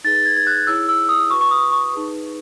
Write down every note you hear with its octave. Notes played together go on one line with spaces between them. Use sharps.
D#4 G#4 B4 A6
G#6
G#6
F#6
E4 G#4 C#5 E6
E6
D#6
F#4 B4 C#6
C#6
D#6
C#6
D#4 G#4 B4